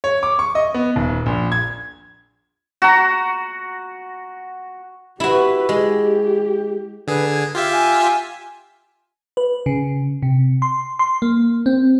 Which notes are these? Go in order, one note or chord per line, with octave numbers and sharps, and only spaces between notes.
C#5
D6
C#6
D#5
B3
D#1
A#1
G#6
F#4 A#5
E4 F#4 G4 B4
G#3 G4
D3 G#4 B4
G#6
F4 G4 E5 F5
G#5
B4
C#3
C3
C6
C6
A#3
C4